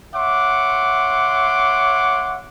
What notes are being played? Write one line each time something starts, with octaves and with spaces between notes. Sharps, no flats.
C#5 E5 F#5 C6 D6